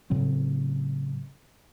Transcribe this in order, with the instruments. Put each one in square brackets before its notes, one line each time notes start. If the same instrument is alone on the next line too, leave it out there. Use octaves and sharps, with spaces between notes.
[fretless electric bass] A2 C#3 F#3 C4